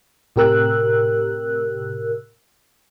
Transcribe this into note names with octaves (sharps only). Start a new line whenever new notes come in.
A2 C3 G4 A#4 E6 F#6